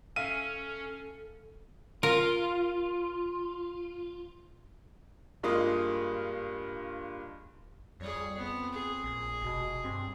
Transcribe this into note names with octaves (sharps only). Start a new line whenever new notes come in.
C#4 A4 E5 F5 D#7
F4 A#4
G2 G#3 A#3 F4 D#6
F2 G3 G#4 C#5
B3 C4
G#4
A#1
F1 B2
G2 C4